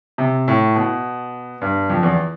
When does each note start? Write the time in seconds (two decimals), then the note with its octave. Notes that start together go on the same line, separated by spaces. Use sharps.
0.18 C3
0.48 A2
0.76 B2
1.61 G2
1.90 F2
2.03 E2